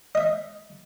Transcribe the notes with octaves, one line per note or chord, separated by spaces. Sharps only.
D#5 E5